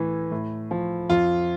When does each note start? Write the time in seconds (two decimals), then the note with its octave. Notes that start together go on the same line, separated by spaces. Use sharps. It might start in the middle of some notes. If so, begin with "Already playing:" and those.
Already playing: A2 E3
0.31 A2
0.71 F3
1.10 F2 F4